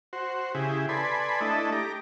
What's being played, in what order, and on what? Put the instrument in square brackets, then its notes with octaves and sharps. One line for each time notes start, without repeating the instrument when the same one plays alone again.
[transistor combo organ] F#4 C5
C#3 E4 G4 G#4
A4 B4 D5 G#5 B5 C6
A3 D4 E4 A4 D#5
G4 A#5 D6